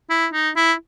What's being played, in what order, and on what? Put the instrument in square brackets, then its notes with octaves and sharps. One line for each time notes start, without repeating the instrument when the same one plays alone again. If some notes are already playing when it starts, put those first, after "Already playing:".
[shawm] E4
D#4
E4